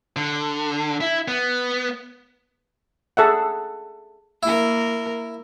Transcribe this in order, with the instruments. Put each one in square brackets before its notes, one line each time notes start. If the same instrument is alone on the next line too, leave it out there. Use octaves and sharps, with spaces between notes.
[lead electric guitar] D3
E4
B3
[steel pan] G#4 A4 E5 F#5
[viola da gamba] A#3 A#4 [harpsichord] E4